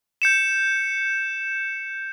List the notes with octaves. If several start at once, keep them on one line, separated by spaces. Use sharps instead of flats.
G6 C#7 E7